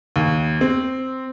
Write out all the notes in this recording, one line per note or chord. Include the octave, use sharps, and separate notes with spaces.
D#2
C4